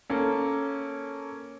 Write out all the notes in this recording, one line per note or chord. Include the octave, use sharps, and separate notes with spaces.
A#3 C#4 A4